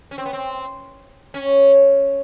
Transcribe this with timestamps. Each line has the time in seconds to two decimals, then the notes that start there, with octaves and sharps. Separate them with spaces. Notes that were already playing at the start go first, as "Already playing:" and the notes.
0.11 C#4
0.18 C4
0.26 B3
0.33 C4
1.34 C#4